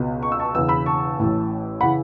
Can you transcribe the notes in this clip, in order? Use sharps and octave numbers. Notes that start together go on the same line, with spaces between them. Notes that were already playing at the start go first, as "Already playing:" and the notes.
Already playing: C#2 B2
C#6
E6
A5 C#6
E1 E2 C#3 E3 E6
B5 E6
A5 C#6
A1 A2 E3
C#3 E3 F#5 B5